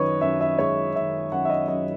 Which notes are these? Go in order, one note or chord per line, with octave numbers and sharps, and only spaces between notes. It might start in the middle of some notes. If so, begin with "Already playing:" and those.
Already playing: F#2 D#3 B4 C#5 D#5
F#2 E5
E5
G#3 C#5
D#3 E5
F#2 F#5
E5
D#5
F#2 D#5